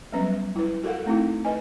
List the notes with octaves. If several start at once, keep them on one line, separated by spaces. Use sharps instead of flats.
F#3 G3 B3 C#4 B4
E4 B4
F#4 A4 A#4 F5 F#5
A3 C4 D#4 E4
B4 D#5 G#5